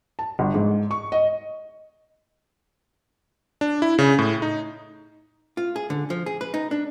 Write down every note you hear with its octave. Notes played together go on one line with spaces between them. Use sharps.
A5
G1
G#2
C#6
D#5
D4
E4
C#3
A2
D#4
F4
G#4
D3
F3
G#4
B4
D#4
D4